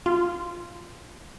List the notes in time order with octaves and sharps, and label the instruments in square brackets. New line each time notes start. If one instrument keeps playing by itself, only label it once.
[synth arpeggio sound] F4